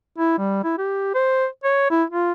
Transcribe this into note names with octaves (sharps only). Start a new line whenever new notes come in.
E4
G3
E4
G4
C5
C#5
E4
F4